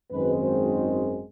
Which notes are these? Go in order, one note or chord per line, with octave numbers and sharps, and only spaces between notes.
G#1 F#2 D#3 G#3 C4 B4
C5